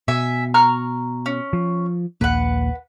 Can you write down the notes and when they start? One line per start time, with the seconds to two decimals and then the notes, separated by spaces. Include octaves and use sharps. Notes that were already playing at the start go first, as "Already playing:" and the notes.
0.08 B2 E5 G#5
0.54 A#5 C#6 F6
1.26 C#4
1.53 F3
2.21 A#1 D#2 A#3 B4 F#5